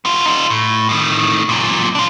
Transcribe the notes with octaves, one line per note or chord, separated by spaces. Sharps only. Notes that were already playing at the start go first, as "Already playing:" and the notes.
B3 F4
D#4 F4
A2
A2 D#3
F#2 A#2
D4 F4